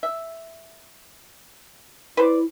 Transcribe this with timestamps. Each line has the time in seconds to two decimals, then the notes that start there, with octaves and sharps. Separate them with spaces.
0.03 E5
2.17 E4 B4 C5 D5